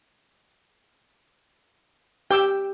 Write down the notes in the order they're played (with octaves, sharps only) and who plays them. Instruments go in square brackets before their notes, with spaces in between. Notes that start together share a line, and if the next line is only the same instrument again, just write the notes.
[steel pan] G4 D6 E6 [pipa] G5